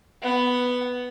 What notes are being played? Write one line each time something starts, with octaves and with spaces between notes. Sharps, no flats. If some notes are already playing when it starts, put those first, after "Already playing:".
B3 F#5